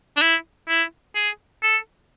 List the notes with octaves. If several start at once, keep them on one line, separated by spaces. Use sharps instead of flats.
D4
E4
E4
G#4
A4